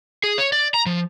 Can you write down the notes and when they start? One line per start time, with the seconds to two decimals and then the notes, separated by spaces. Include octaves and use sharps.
0.24 G#4
0.38 C#5
0.53 D5
0.74 A#5
0.86 F3